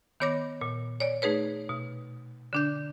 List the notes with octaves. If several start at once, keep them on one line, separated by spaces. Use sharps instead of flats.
D#3 B3 C#5 D6 A#6
A#2
C#5 D5
A3 D#4 G#4 B4 C#5
B2
D3 D4 G6